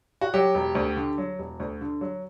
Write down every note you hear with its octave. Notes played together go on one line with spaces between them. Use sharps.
F#4
F#3 G4
E1
D2
D3
F#3
E1
D2
D3
F#3